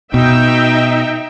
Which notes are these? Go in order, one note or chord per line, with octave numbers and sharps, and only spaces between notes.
B2 D#4 E5 G5